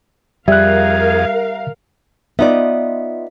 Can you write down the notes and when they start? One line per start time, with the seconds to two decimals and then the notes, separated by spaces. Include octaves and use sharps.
0.48 F2 G3 G#4 A#4 E5 F5 F#6
2.39 B3 D#4 F4 D5 E5